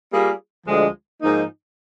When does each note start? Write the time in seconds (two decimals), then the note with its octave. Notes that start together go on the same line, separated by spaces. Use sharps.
0.09 G3 A#3 F4 G#4
0.65 D2 D3 F3 G#3
1.22 G#2 F3 A#3 D#4